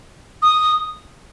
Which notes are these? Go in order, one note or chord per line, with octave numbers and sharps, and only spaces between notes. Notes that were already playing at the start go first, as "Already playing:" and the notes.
D#6